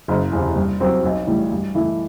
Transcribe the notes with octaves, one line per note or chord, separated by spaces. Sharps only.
F#1
E2 C3
G2
F#3 C4 G4
B1
A2 E3 G3
G2
E3 A3 E4